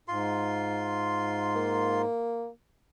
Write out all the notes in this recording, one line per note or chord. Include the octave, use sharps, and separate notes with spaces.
G#2 F4 C6
A#3